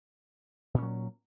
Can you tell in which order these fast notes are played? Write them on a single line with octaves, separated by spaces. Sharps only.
A#2 C#4 F#3